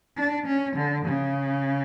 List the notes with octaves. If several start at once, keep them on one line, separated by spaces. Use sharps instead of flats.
D4
C#4
D3
C#3